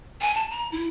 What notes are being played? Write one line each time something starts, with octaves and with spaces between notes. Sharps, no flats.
G#5
A5
A#5
E4